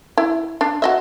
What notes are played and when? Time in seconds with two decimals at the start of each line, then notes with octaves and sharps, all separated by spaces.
0.18 E4
0.61 D4
0.82 F#4 D#5 E5